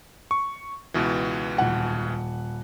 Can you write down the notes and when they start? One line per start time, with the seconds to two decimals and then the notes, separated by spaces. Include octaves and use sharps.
0.31 C#6
0.94 C#2 B2 E3
1.58 D#1 F#5